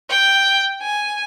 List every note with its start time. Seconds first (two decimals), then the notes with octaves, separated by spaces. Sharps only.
0.10 G5
0.81 G#5